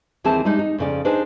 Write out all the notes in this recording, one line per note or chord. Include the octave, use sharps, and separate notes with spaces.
D#2 E3 C4 G#4 A5
G3 G#3 D#4 G4
D#4
F2 C#3 D5
D4 D#4 G#4 B4 C5